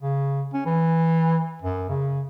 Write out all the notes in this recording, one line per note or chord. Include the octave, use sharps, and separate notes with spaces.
C#3
C#4
E3
F#2
C#3